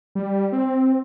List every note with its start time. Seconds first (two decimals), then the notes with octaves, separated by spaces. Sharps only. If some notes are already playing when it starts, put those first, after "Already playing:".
0.15 G3
0.52 C4